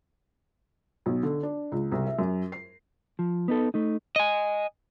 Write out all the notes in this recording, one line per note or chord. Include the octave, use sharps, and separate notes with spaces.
B1
D3
D4
C#2
C2
E5
F#2
C7
F3
B3 D#4 A4
A3 D#4
D#5 G#5